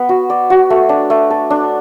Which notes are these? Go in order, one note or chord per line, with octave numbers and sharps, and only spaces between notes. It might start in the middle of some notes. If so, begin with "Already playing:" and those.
Already playing: B3 B4
F#4
D5
F#4
A3
D4
A3
A4
D4